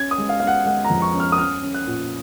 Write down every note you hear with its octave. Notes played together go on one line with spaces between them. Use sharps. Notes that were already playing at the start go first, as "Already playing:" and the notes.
Already playing: C#4 G#6
D#6
G#3
F5
C#4 F5
F#5
G#3 F#5
A#5
F2
C#6
C#4
F6
D#6
C#4 F6
C#4
F#6
A#2